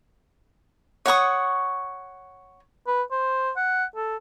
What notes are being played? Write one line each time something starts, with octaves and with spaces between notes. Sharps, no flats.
C#5 F#5 C#6 D#6
B4
C5
F#5
A4